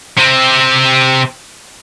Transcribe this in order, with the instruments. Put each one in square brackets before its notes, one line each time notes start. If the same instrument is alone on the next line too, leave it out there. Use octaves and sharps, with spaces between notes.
[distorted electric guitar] C3 C4